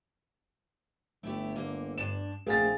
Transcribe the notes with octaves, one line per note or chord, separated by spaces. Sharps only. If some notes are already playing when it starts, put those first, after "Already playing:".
G1 A3 E4 G4
D3 A#3
G2 D4 E7
A#1 A3 C4 G#4 F5 A6